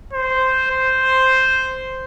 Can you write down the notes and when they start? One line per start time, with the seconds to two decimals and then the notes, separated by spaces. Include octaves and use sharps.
0.13 C5
0.71 C5